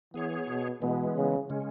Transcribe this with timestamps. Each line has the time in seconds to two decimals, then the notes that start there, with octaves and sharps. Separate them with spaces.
0.14 E3 B3 G#4 C#5
0.47 B2
0.82 B2 E3 G#3 B3
1.16 C#3
1.50 C#3 G#3 C#4